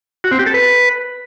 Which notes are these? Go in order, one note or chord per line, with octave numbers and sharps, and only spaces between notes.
F#4
C4
G4
A4
B4